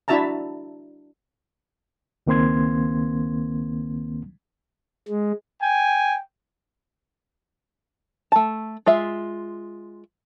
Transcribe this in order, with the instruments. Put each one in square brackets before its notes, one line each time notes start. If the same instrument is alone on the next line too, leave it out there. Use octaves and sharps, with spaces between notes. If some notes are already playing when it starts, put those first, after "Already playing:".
[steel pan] D4 E4 F#4 E5 A5 A#5
[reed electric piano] C#2 D#3 A#3 C4 C6 G#6
[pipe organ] G#3
[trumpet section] G5 G#5
[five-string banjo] A3 A5
G#3 F4 E5